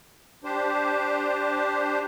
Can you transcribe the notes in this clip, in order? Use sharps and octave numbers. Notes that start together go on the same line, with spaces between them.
D4 G4 C5